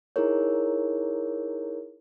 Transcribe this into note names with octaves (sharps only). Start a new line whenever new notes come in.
D#4 E4 G#4 A#4 C#5